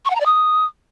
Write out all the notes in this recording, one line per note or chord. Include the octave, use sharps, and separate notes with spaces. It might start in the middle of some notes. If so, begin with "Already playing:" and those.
C#6
F#5
A#5
D5
D#6